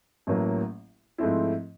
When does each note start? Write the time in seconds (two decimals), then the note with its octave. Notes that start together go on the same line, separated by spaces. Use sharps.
0.27 A1 A2 F#3 A#3
1.18 G#2 F3 A3 C4 E4